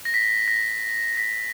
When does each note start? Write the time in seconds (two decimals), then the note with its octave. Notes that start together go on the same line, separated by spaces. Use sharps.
0.05 A#6
0.14 B6
0.48 A#6
1.17 B6